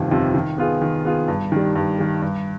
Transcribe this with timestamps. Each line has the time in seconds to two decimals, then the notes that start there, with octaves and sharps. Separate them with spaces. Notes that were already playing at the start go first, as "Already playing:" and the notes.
Already playing: G1 F2 C3 D#3
0.11 F2 C3 D#3
0.34 D#3
0.58 B3 F4 G#4
0.82 D#3
1.05 B3 F4 G#4
1.28 G2
1.52 D#3 G3
1.76 G2
1.99 D#3 G3
2.22 G2